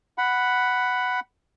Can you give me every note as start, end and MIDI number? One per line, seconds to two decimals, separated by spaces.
0.18 1.20 78
0.18 1.20 83